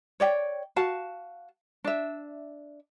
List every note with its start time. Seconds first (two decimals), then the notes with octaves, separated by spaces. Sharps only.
0.20 C#5 D5 G5
0.76 F#4 F5 A5
1.84 D4 E5